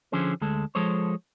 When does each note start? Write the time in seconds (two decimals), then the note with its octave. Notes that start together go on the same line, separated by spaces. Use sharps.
0.12 D3 F3 C#4 G#4 C5
0.41 D2 G#3 A4
0.75 F3 G#3 A4 C5 C#5